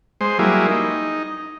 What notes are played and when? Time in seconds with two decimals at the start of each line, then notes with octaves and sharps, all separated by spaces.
0.21 G#3 C5
0.39 F#3 G3 A#3 E4 G#4
0.68 D#4